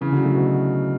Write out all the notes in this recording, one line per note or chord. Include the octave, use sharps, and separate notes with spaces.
C#3 E3
D3 F#3
F#3 A3
B2